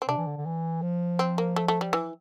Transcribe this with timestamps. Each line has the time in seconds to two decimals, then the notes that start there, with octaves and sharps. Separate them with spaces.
0.02 C4
0.08 C3 D4
0.18 E3
0.27 D3
0.37 D3
0.46 E3
0.82 F3
1.19 C4
1.38 A#3
1.56 A3
1.68 A3
1.81 G3
1.93 E3